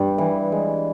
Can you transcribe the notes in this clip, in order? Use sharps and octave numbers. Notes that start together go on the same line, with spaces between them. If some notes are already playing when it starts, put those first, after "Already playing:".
Already playing: G2
E3
G#3